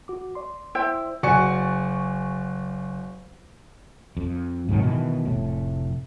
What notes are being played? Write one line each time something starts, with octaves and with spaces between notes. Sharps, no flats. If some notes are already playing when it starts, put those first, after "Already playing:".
F#4 D6
D5 C6
E4 C5 G5
F#1 F#4 D5 G#5 C#6 C#7
F2
G#2 C3 D#3 F#3
B2 D#3 E3
F1 A2